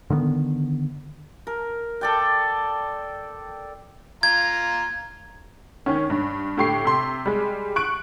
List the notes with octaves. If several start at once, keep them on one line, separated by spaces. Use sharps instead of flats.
D3 D#3 A#3 B3
A#4
A4 D5 G5
F4 A#5 G#6
D#3 C#4
G2
A2 D3 G4 C#6 C7
C3 C6
G3 G#3
C#6 F#6 D7